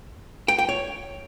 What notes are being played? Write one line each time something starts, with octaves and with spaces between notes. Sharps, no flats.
G5
G5
C#5